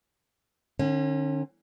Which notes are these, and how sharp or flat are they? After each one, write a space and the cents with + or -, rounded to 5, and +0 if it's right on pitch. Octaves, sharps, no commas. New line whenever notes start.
D3 +40 C#4 -30